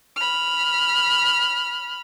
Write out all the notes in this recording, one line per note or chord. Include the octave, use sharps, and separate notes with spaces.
B5 F6